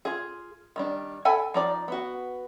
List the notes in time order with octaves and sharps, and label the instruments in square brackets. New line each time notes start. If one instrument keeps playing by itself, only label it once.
[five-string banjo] F4 G#4
D#3 G3 D4
A4 G5 G#5 B5
F3 D#4 D5
B3 F#4